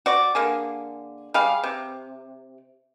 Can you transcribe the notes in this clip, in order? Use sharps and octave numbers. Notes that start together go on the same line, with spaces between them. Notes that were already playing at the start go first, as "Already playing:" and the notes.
F#4 D5
D3 A#3 G#4
G3 G#4 F5
C3